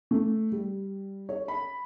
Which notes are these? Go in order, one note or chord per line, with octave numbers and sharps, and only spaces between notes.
A3
G3
C#5
B5